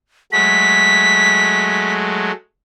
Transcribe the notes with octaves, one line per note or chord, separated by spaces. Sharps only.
F#3 G#3 A3 B6